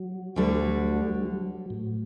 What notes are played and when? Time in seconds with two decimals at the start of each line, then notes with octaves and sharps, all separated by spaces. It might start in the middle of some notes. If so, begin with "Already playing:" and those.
Already playing: F#3
0.36 D2 D3 G3
1.15 G3
1.25 F#3
1.70 A2